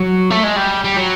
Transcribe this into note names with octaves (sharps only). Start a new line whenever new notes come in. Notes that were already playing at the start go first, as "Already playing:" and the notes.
Already playing: F#3
A3
G#3
G3
G3
F#3